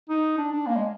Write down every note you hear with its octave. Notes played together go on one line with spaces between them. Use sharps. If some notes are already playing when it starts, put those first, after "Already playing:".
D#4
D4
D4
A#3
G#3